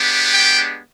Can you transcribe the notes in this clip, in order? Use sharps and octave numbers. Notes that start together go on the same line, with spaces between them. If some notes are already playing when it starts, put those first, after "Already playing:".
Already playing: G#3 B3 D4 G4
G5